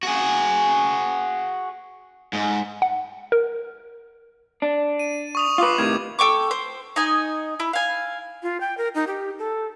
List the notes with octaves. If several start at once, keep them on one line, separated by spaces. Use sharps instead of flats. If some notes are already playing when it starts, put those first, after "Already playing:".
F#4 G#4
G#2
F#5
A#4
D4
D#7
C#6 D#6 F7
F4 B4 D6 C7
A2 C3 D#3 G#6
A4 G5 C#6 D6
C5
D#4 D#5 G#5
E4
F5 G#5
F4
G5
A#4
D#4
G4
A4